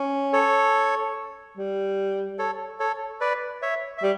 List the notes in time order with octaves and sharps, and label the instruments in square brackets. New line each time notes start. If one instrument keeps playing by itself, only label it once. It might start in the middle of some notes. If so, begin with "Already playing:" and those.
Already playing: [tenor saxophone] C#4
[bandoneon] A4 C#5
[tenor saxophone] G3
[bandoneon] A4 C#5
A4 C#5
B4 D5
C#5 E5
E5
[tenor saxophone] G3